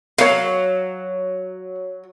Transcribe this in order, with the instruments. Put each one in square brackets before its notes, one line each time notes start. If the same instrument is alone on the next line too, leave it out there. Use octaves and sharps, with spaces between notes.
[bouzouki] F#3 [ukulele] C#5 F5